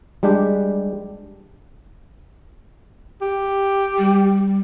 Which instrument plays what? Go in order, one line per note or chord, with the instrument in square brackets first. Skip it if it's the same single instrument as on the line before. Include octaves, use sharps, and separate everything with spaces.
[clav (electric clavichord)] G3 G#3 D4 G4
[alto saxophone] G4
[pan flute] G3